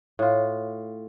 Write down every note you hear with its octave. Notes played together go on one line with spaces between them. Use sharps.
A2 F4